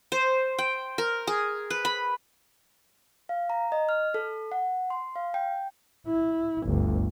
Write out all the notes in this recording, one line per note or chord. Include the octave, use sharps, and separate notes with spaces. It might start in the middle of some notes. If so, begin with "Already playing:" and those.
C5
G5
A#4
G#4
B4
B5
F5
A#5
D#5
F6
A4
F#5
C6
F5
G5
E4
G1 D2